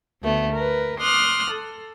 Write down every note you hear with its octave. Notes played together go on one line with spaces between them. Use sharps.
D2 A3 B3
A#4 B4
C6 D6 D#6 F6 F#6
A4